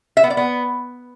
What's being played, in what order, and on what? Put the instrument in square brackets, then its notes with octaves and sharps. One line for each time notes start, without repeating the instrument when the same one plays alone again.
[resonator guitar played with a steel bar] E5
B3
D5
B3